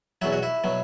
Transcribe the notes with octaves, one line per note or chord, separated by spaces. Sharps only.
E2 B2 F#3 E4
F#4
E4
B2 F#3